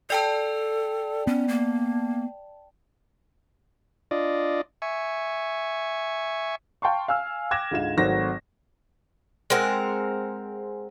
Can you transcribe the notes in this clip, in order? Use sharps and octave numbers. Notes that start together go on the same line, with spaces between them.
A4 D5 G5 A5
B3 C#4
A#3
D4 F4 D5 D#5
E5 G#5 C#6
F5 G5 A5 C6 C#6
F5 G#5 E6 F6
G5 D6 F#6 G#6 A#6 E7
D2 G#2 F4 E7
G#1 F#3 A3 C4 F#4 A#6
G#3 C4 A#4 F#5